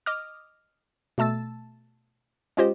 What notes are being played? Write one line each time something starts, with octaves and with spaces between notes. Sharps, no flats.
D#5 D6 D#6 F6
B2 A3 A5 E6 A6
G#3 C#4 F4 G4 C5 D#5